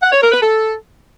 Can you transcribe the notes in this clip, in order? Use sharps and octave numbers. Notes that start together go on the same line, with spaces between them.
F#5
C#5
A#4
B4
A4